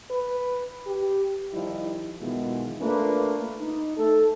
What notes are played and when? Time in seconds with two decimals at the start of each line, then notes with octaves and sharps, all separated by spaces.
0.11 B4
0.86 G4
1.53 D#3 F3 G3 D#4 E4
2.20 B1 B2 D#3 E3 G#3 F4
2.80 A3 A#3 D4 F4 B4
3.59 D#4
3.97 A3 A4